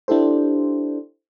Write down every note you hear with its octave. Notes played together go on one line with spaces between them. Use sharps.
D4 E4 G4 A4 C5